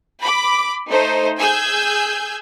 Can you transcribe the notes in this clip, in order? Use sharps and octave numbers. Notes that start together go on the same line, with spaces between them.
B5 D6
A3 D#4 C5
G#4 G#5 E6 G6